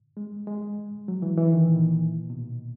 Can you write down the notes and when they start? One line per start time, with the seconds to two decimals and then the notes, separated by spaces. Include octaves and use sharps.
0.17 G#3
0.47 G#3
1.08 F#3
1.22 E3
1.37 E3
1.53 D#3
1.68 A#2
2.22 A#2
2.30 B2